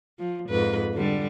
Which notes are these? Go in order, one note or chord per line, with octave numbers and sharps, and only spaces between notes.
F3
F2 G#2 B4
D3 G3